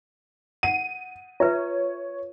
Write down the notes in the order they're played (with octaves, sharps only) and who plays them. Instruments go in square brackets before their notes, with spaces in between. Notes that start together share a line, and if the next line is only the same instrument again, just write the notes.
[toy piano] F#5 [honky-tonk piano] D#7
[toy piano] F4 B4 E5 [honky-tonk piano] C#5